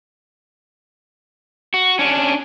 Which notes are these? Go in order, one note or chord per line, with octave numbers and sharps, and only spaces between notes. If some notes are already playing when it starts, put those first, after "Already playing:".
F#4
C#4 D4